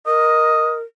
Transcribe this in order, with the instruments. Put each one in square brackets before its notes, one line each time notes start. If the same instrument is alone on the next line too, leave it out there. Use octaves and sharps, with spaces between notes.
[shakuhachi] A#4 [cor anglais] D#5